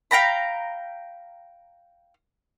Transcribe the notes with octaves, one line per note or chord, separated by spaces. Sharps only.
F5 G5 A#5 B5